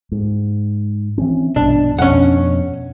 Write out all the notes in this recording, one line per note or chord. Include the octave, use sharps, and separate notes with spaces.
G#2
E3 C4 C#4
A#1 G2 B2 D4
F2 B2 C#4 D4 F#5